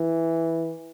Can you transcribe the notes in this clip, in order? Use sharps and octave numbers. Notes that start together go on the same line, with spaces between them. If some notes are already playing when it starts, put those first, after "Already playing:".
Already playing: E3